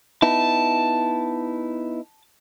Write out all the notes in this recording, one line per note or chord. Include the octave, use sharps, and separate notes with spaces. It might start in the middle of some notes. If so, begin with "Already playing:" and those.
B3 D#4 E4 A5